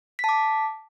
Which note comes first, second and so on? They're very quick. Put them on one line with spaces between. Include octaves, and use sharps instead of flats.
B6 A5 D6